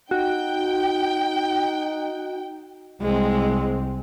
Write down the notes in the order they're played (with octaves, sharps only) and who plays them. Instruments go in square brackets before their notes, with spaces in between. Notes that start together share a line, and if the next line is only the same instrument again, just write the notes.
[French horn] D#4 [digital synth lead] F#4 [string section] G5
[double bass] C2 C4 [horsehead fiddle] G#3